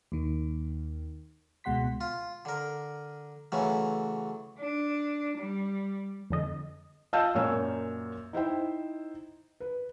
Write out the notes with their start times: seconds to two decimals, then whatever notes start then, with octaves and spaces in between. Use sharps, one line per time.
0.12 D#2 D#3
1.64 C#2 B2 G#3 F#5 C6 B6
2.01 F4
2.45 D3 A#4
3.52 C#3 E3 F#3 A3
4.59 D4
5.37 G3
6.30 F2 D3 D#5
7.13 F4 D#5 F5 A5 E6 G6
7.35 F#2 A#2 A#3 C#5 G#5 E6
8.33 D#4 E4 C5 G5
9.60 B4